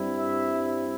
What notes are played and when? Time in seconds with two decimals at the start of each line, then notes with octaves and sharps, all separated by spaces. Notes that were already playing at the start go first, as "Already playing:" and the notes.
Already playing: G2 G3 C4 E4
0.18 E5